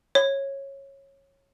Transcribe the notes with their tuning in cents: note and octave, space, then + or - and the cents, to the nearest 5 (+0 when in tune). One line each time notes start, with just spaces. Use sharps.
C#5 -15